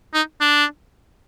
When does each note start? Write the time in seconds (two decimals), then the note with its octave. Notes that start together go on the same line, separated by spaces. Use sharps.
0.14 D#4
0.41 D4